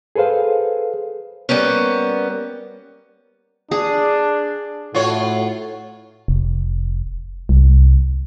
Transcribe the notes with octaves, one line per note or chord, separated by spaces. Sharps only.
G#4 A4 B4 C5 F5
G3 A#3 B3 C#4
D4 G#4
A2 F4 F#4 C#5
F1
C2